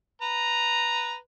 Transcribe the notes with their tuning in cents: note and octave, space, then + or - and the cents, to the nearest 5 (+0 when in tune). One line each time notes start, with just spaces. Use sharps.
B4 +0 A#5 +0